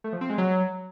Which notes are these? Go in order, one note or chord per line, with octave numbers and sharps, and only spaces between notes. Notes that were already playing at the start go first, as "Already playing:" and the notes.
A3
F3
C4
G#3
F#3